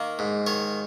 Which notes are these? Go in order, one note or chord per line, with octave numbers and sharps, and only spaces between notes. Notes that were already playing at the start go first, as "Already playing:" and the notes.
Already playing: D#3 A#3
G#2
D#3 C#5